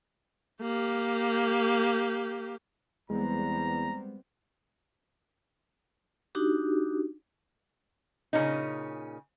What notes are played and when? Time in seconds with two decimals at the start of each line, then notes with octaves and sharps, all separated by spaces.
0.62 A#3 G4
3.10 E2 G3 G#3 B3 C4 A#5
6.35 D4 D#4 F#4 G4
8.33 A#2 C#3 F3 G#3 C#4 D#4